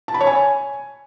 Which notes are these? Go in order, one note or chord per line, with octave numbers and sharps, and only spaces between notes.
A5
B5
C#5
G#5